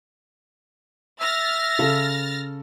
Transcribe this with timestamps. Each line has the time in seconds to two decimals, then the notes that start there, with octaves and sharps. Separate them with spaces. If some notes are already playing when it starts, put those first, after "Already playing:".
1.21 E5 F6 A6 A#6
1.79 C#3 A4